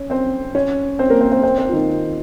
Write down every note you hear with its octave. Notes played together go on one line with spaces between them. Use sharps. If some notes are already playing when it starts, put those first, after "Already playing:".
Already playing: C#4
C4 C5
C#4 C#5
C4 C5
A#3 A#4
C4 C5
C4 C5
C4 C5
C4 C5
F4
D#3 D#4